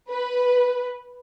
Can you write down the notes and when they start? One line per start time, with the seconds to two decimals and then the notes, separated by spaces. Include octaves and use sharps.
0.10 B4